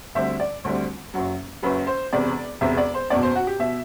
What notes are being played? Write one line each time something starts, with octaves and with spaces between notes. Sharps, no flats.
D2 D3 G3 C4 E5
D5
D2 D3 G3 C4
F#1 F#2 F#3
F#1 F#2 F#3 B4
C5
E1 E2 C3 D5
E1 E2 C3 E5
D5
C5
F#1 E2 B2 D5
C5
F#4
G4
B2 E5